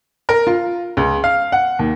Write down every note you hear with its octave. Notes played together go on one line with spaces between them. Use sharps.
A#4
F4
C#2
F5
F#5
D#2